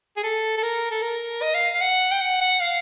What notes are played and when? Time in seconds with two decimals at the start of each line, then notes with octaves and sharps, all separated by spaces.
0.17 G#4
0.23 A4
0.57 A4
0.63 A#4
0.91 A4
1.02 A#4
1.42 D#5
1.54 F5
1.75 F5
1.81 F#5
2.11 G5
2.20 F#5
2.41 F#5
2.60 F5